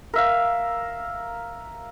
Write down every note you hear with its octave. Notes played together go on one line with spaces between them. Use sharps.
A#4 E5 F5